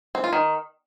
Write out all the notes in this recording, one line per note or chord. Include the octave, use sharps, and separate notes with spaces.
C4
F4
D#3